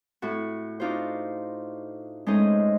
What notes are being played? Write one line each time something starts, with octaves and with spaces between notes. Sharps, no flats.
A2 F#4
D4 D#4 F4 F#4 C5
G#3 A3 C#4 D#4 C5 D#5